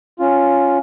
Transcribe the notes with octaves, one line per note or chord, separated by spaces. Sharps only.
C#4 F4